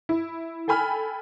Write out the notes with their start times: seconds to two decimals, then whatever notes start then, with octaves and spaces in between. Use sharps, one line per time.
0.09 E4
0.68 A4 G5 G#5 B5 F6